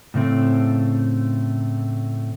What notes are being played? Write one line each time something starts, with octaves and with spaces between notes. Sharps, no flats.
A2 C#3 A3 C4